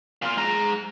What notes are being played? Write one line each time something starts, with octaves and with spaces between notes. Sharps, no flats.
A#2 F4
G#3 A#5